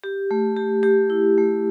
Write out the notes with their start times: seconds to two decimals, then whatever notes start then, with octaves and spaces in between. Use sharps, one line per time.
0.04 G4
0.31 A3
0.57 G4
0.83 G4
1.10 E4
1.38 A3